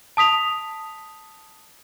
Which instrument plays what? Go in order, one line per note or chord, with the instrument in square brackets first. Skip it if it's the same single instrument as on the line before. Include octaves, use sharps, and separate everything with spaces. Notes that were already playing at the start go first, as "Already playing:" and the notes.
[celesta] A5 D#6 B6 F7